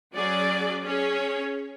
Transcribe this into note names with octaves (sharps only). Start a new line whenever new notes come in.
F#3 C#4 G#4 D5
C#4 G#4 C#5